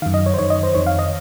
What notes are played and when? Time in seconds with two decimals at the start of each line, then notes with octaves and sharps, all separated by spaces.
0.02 F#2 D#3 F5
0.14 D#5
0.26 C#5
0.34 C5
0.39 F#2 D#3 C#5
0.50 D#5
0.63 C5
0.74 F2 D#3 C#5
0.87 F5
0.99 D#5